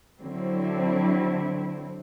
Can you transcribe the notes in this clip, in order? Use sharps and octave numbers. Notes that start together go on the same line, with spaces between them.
D3 F#3 C4 E4